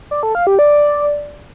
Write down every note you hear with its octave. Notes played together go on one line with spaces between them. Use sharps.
D5
A4
F5
G4
D5